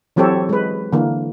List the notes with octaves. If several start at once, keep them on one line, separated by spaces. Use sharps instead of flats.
E3 F#3 C4 G4 A4 C#5
G#3 B4
D3 E3 A#3